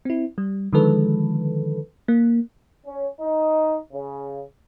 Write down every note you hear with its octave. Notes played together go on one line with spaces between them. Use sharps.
C4 E4
G3
D3 D#3 F3 G#3 A4 B4
A#3
C#4
D#4
C#3